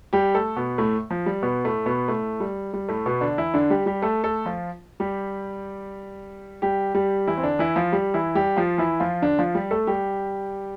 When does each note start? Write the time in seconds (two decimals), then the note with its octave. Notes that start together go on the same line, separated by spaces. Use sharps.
0.13 G3 G4
0.35 A3 A4
0.57 B2 B3
0.78 A2 A3
1.10 F3
1.26 G3
1.43 B2 B3
1.65 A2 A3
1.86 B2 B3
2.08 A2 A3
2.40 G3
2.73 G3
2.89 A2 A3
3.06 B2 B3
3.21 D3 D4
3.38 E3 E4
3.54 D3 D4
3.70 G3 G4
3.86 G3 G4
4.02 A3 A4
4.24 A3 A4
4.46 F3 F4
5.00 G3 G4
6.62 G3 G4
6.95 G3 G4
7.27 E3 E4
7.38 C4
7.43 D3 D4
7.59 E3 E4
7.76 F3 F4
7.92 G3 G4
8.14 E3 E4
8.35 G3 G4
8.56 F3 F4
8.78 E3 E4
9.00 F3 F4
9.22 D3 D4
9.39 F3 F4
9.55 G3 G4
9.71 A3 A4
9.87 G3 G4